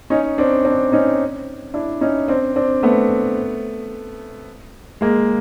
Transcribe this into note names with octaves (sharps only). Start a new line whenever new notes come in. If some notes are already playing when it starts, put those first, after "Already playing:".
C#4 D#4
C4 D4
C4 D4
C#4 D#4
D4 E4
C#4 D#4
C4 D4
C4 D4
A3 B3
G#3 A#3